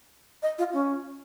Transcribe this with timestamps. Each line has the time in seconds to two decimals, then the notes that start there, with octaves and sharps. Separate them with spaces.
0.42 D#5
0.58 F4
0.73 C#4